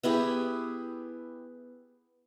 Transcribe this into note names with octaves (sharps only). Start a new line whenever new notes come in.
B3 E4 G4 G#4